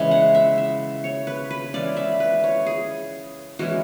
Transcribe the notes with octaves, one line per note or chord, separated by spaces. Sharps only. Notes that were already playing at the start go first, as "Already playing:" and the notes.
Already playing: C#3 E3 G#3 E5
F#5
E5
E5
C#5
B4
B4
C#3 E3 G#3 C#4 D5
E5
B4
C#5
G#4
E3 G#3 C#4 E4 F#4